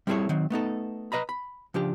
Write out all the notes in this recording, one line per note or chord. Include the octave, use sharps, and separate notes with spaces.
G3 C4 E4 G#4 A4 C#5
D#3 F#3 C4
A3 B3 D#4 A4
B4 D#5 A#5 B5
B5
C#3 F3 D4 G4